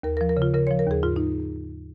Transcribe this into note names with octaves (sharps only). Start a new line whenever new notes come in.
D#2 A#4
A#4
F3
A#4
C#3
F4
C#3 A#4
F3 C#5
A#4
D#2 G#4
G#2 F4
D#4